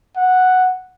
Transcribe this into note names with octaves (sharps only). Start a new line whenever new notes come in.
F#5